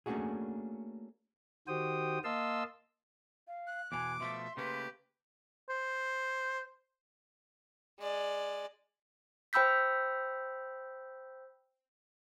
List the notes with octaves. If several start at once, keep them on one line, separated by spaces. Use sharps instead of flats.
A3 A#3 C#4 D4 F#4 G#4
D#3 F#4 G4 C5 G5 D#6
A#3 D#5 F5 A5 C6 E6
F5
F#6
E2 B2 G#5 D6
B2 F3 A3 E5 C6
C#3 A3 A#3 G4 B4
C5
G#3 D5
C5 G5 B5 E6 G6 B6